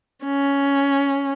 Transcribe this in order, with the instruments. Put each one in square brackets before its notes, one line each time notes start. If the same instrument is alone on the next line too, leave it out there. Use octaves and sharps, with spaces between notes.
[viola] C#4